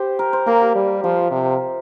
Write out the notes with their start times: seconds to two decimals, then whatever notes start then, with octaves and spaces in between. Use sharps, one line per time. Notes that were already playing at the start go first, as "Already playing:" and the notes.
Already playing: G4 C5
0.19 A#4
0.33 C5
0.47 A#3 A#4
0.61 G4
0.75 G3
1.04 F3 F4
1.31 C3